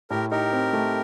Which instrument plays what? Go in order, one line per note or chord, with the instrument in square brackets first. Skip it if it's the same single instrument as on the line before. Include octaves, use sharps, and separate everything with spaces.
[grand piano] A2 [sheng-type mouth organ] G4 A#4
[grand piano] D#4 [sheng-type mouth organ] G4 A#4
[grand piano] C4
A3